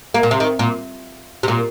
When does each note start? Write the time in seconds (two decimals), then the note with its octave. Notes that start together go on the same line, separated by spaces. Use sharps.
0.14 A#3
0.23 A#2
0.31 C3
0.40 D#3
0.59 A#2
1.43 C3
1.48 A#2